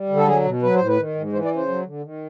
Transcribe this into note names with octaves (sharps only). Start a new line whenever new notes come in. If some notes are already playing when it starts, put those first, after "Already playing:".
Already playing: G3
D3
A4
F#3 G#4
B2
F#3 B4
A2 C5
B4
D#3
G#2
E3 C5
D5
C#3
C5
F#3
D3
D#3